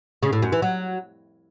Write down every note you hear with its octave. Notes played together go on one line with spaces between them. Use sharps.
C#3
A2
F#2
E3
F#3